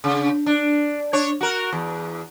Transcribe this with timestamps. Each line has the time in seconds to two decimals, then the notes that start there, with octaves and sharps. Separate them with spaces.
0.04 C#3
0.46 D4
1.13 D4 C#5
1.41 F#4 A#4
1.73 E2